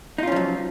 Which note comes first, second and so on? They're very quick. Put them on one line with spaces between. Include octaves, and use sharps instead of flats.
D#4 F4 C#4 F3 F#3